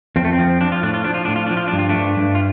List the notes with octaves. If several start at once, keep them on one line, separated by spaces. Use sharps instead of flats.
F2 C4
A3
C4
F3
F3 D4
F4
A2 D4
F4
F3 D4
F4
A2 D4
F4
F3 D4
F4
G2 D4
F4
A3 D4
G2
G2
F4